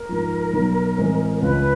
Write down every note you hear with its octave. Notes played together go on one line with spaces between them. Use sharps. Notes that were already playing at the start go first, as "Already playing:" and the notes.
Already playing: A#4
G#2 F3
B1
A2 E3 G#3 C4
C5
C#2 B4